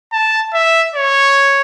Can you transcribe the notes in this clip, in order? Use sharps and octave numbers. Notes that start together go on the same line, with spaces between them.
A5
E5
C#5